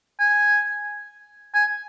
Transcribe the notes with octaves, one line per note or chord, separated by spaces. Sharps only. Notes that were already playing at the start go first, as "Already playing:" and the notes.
G#5
G#5